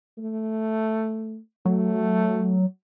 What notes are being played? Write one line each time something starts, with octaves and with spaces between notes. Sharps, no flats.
A3
F#3 A3